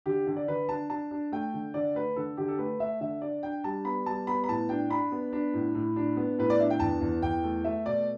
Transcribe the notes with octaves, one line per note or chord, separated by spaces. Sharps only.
D3 G4
D3
D5
D3 B4
D4 A5
D4 A5
D4
A3 G5
D3
D3 D5
A3 B4
D3 A4
D3 G4
A4
A3 B4
A3 E5
D3 E5
D4 D5
D4 G5
G3 A5
B3 B5
G3 A5
B3 B5
B5
A2 A5
D4 G5
D4 B5
B3
D4
A2
A2
D4
B3
A2 B4
D5
D4 E5
G5
E2 A5
E2
E2 G5
A3
A3 E5
B2 D5